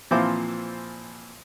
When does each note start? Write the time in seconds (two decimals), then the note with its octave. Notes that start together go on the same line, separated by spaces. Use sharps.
0.11 A#2 E3 F3 C4 C5 D6